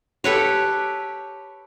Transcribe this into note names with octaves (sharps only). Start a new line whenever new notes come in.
G4 A4 B4 C#5